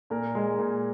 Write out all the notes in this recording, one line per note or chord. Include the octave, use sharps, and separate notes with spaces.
A#2 A#4
G#3
A#2